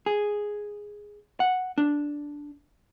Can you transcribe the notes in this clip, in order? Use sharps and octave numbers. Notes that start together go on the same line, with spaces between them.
G#4
F#5
D4